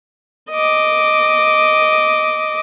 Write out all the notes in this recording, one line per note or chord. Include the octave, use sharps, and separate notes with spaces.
D#5 D6